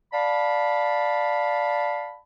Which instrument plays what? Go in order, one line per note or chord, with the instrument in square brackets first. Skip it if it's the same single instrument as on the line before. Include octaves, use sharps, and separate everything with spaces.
[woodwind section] D5 F5 A5 B5